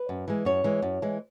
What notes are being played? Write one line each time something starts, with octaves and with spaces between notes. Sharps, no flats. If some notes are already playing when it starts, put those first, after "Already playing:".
Already playing: B4
F#2
E3 G#3
F#2 C#5
E3 G#3
F#2
E3 G#3